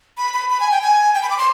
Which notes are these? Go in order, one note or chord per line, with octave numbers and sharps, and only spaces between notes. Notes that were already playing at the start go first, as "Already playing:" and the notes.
B5
B5
B5
G#5
G5
G#5
G5
B5
D6
C6